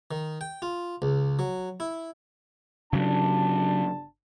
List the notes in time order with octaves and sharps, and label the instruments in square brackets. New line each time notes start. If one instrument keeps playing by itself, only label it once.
[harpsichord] D#3
G5
F4
C#2
F#3
E4
[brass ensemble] G1 D4 A5 [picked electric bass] C#3 F#3